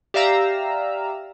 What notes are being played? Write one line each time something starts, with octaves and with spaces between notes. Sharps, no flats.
G4 D5 E5 F5 A#5 E6